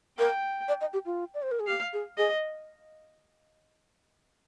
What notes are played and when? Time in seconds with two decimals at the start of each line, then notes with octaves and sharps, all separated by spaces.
0.18 A#4 G5
0.68 D5
0.81 D#5
0.93 G4
1.06 F4
1.34 D5
1.42 C5
1.51 A#4
1.60 G#4
1.67 G4 F5
1.93 G#4
2.17 G#4 D#5